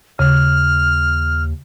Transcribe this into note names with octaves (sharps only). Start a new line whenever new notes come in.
D#2 C#3 F6